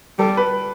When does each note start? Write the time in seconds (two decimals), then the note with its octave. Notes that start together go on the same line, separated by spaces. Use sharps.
0.19 G3 A4
0.37 B4